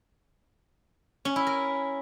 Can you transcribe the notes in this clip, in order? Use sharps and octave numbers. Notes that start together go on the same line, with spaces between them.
C#4
E4
A#4